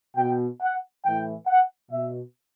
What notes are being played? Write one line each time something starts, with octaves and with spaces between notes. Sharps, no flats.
B2 G5
F#5
A2 E3 G5
F#5
B2 E5